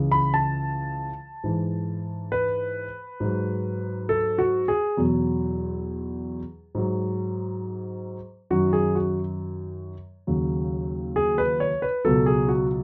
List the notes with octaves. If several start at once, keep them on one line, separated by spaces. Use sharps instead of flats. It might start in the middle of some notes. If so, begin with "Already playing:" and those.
Already playing: C#2 C#3 E3
B5
A5
G#2 E3
B4
G#2 F#3
A4
F#4
G#4
E2 B2 F#3
G#2 F#3
F#2 D#3 F#3 F#4
G#4
F#4
D#2 C#3 F#3
G#4
B4
C#5
B4
C#2 B2 F#3 A4
G#4
F#4